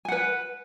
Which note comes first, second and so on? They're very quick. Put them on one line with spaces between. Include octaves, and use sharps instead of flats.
G#5 F#5 B4